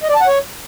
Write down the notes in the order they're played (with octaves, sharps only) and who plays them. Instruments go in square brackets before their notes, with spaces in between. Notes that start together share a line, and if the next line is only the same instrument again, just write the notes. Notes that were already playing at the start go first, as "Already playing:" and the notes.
[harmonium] D#5
D5
A5
F#5
C#5